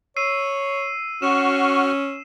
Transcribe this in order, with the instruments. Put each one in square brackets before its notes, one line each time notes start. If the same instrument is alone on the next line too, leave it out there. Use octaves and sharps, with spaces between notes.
[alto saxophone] C#5 [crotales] E6 C7 D#7
[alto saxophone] C#4 [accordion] F#4 C#6 F6 [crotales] E7